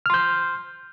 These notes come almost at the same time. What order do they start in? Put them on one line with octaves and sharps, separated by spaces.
F6 C6 G6